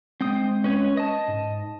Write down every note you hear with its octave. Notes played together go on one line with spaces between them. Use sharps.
G#3 C4 G5 D#6
C#4 B4 C#5
D#5 A5
G#2